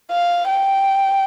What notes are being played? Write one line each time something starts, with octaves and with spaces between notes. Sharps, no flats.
F5
G5